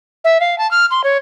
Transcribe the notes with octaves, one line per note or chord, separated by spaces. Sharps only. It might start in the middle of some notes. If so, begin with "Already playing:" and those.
E5
F5
A5
F6
C6
C#5